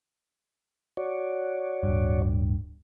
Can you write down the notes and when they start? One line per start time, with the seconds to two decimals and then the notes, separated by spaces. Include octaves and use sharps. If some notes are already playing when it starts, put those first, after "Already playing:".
0.97 F#4 C#5 D5
1.83 D1 G2